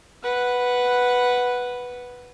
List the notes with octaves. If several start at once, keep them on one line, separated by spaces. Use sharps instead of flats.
B4 F#5